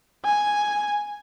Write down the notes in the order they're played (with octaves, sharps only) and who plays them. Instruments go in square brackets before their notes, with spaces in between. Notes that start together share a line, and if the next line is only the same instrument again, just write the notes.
[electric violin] G#5